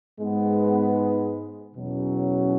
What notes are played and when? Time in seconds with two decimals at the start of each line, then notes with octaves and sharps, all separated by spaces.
0.21 G#2 G#3 B3
1.75 E2 B2 F#3 C#4